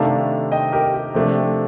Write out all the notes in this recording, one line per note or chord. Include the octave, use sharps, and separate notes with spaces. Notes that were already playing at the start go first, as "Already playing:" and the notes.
Already playing: C3 D#3 A3 D4 F5 A5
D#5 G5
G4 A#4
G4
C3 F3 A3 D4